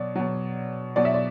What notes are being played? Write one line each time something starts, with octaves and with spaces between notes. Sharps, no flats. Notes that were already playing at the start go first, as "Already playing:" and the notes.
Already playing: B2 F#3 D5
B2 F#3
B2 F#3 D5
E5
D5